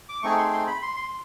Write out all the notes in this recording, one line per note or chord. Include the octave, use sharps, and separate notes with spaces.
D6
A3 C4 D#4 G#4 C#6
C6
C6
B5
C6
C6